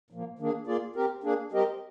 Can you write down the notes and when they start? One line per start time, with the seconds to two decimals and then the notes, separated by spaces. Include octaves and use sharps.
0.11 A#2 F3 A#3
0.39 D#3 A#3 D4 G#4
0.67 A#3 F4 G#4 D5
0.95 C4 G4 A#4
1.23 A#3 D4 G#4
1.52 G3 C4 G4 A#4 D#5